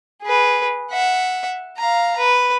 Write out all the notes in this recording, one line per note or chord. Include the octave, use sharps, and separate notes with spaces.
G#4 B4
E5 F#5
F5 A#5
B4